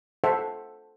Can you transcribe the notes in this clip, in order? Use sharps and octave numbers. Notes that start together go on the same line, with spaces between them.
A4 C5 E5 F#5